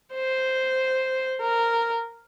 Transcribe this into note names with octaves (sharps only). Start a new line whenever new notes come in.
C5
A#4